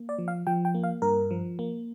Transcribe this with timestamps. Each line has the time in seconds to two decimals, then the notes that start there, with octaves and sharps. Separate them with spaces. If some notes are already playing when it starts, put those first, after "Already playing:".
Already playing: A#3
0.09 D5
0.19 F3
0.28 F5
0.47 F3 G5
0.65 G5
0.75 A#3
0.83 F5
1.02 G2 A#4
1.31 F3
1.59 A#3